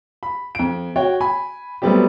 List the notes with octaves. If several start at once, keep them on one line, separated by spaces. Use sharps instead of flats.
B5
F2 D7
F#4 C#5 G5
G#5 B5
F#3 G3 A3 B3 C4 G4